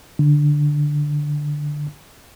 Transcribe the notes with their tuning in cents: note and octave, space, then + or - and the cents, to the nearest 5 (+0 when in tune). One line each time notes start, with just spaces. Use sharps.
D3 +5